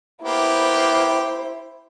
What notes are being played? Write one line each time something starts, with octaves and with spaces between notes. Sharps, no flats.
A#3 B3 E4 G4 C5